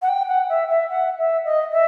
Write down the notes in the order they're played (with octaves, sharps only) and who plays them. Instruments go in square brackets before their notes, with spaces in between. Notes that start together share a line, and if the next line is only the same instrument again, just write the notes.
[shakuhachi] F#5
G5
F#5
E5
E5
F#5
E5
D#5
E5